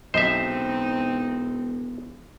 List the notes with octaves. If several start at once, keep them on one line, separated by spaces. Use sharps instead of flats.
E1 B1 F#3 C4 D#4 C5 D#5 E5